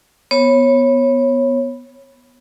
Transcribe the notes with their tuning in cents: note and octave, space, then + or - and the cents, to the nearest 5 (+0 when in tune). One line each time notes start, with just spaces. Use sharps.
B3 +0 C#5 -20